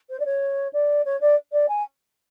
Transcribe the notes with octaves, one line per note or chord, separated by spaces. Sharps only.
C5
D5
C#5
D5
C#5
D5
D5
G#5